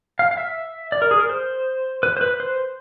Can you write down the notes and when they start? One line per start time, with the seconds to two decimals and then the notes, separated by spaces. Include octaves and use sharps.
0.19 F5
0.31 F5
0.37 E5
0.92 D5
1.02 A#4
1.11 G#4
1.20 A#4
1.29 C5
2.03 B4
2.17 C5
2.21 B4
2.40 C5